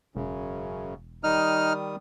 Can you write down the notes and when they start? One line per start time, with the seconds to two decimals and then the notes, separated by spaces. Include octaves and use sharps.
0.16 E1 F#2 C#3
1.24 D#3 G3 D#4 D#6 F6